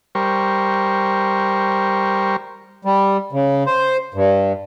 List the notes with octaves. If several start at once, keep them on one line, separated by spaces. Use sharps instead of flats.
G3 A#4 C5 C#6
G3
C#3
C5
G2